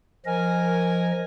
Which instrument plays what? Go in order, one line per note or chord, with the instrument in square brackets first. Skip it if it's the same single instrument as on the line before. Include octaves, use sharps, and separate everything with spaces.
[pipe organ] F3 D#5 [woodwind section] A#4 G#5